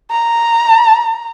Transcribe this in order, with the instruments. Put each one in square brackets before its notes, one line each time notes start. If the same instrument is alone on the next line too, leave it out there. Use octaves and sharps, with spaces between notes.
[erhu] A#5